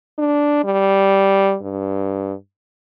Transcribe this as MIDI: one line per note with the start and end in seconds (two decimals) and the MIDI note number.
0.18 0.63 62
0.64 1.56 55
1.62 2.33 43